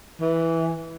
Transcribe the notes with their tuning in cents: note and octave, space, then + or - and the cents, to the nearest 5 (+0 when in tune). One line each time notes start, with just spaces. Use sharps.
E3 -5